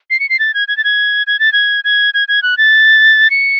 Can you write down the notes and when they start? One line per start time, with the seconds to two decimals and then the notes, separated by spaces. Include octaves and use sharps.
0.10 C7
0.20 C#7
0.29 C7
0.39 A6
0.54 G#6
0.68 G#6
0.77 A6
0.84 G#6
1.27 G#6
1.39 A6
1.53 G#6
1.84 G#6
2.14 G#6
2.28 G#6
2.43 F#6
2.57 A6
3.30 C#7